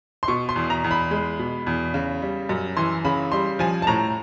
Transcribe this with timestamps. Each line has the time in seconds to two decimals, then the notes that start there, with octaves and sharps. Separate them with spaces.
0.23 C6
0.28 B2 C#6
0.49 C6
0.56 E2
0.70 A#5
0.84 E2
0.91 B5
1.11 G#3
1.39 B2
1.67 E2
1.94 C#3
2.22 G3
2.49 F#2
2.77 E3 C6
3.05 C#3 B5
3.32 G3 C6
3.59 F3 G#5
3.82 A5
3.87 A2 A#5